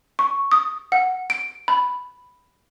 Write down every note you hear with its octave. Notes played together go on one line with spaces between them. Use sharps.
C#6
D#6
F#5
D7
B5